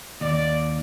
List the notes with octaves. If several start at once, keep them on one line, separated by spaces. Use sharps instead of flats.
D#2 D5